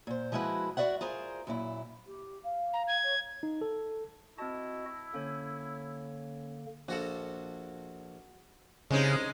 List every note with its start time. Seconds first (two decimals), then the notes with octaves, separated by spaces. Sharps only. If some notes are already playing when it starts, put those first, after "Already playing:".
0.07 A#2 C5
0.32 F3 G#3 E4 F#4 B4
0.77 F#4 G#4 D5 E5 F#5
1.01 F4 G#4 A#4 C5
1.47 F#2 A#2 E4
2.06 G4
2.44 F5
2.73 A#5
2.88 G#6
3.03 C#5
3.43 D#4
3.61 A4
4.38 C4 E4 F#4 D#5 A5
5.14 D3 A#3 C#4 C#5
6.88 A#1 F4 F#4 A4
8.91 C2 C#3 G#3 C#4 D#4 C5